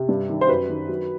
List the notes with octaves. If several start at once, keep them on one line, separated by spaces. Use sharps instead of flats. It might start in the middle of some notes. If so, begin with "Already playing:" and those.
Already playing: C3
G2
D#3
C5
F#2 B4
D#3
F#3